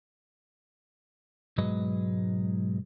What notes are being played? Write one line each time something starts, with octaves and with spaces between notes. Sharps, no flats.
B1 G#2 F#3 G#3 B4 D#5